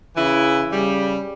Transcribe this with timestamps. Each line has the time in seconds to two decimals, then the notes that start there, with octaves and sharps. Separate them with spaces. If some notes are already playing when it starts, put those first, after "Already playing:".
0.17 C#3 E3 E4
0.72 C#3 G3